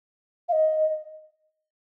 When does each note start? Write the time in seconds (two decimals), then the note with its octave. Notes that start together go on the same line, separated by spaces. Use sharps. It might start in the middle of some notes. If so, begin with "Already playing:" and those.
0.49 F5
0.52 D#5